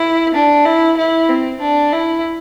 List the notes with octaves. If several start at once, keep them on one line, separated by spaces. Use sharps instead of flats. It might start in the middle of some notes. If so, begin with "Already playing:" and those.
Already playing: E4
D4
E4
E4
C4
D4
E4